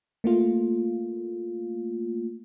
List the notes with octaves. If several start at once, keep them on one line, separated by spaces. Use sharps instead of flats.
A3 A#3 F4